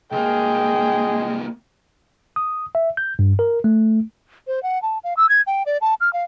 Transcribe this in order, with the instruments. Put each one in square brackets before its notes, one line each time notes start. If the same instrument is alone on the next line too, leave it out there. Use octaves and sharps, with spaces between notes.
[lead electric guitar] C2 A#3 [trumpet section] G#3 G#4 [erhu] G5
[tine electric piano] D#6
E5
G6
G2
A#4
A3
[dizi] C5
F#5
A5
F5
E6
G#6
G5
D5
A5
F6
F5